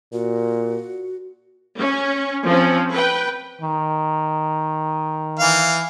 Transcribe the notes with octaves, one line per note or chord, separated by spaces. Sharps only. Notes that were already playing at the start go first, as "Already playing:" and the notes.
A#2 F#4
C#4
F3 C4 C#4
B4 G5
D#3
E3 F5